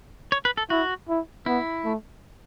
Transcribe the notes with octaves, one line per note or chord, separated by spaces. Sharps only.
C#5
B4
A4
E4 F#4
E4
B3 E4
A3